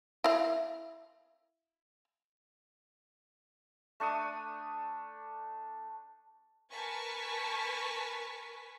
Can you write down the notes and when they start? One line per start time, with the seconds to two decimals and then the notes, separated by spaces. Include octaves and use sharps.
0.24 E4 F5
4.00 A3 D4 C#6 D#6
6.72 A#4 B4 G#5 A5 C#6 B6